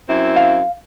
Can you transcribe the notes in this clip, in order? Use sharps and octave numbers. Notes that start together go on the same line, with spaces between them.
F#2 C4 E4
F5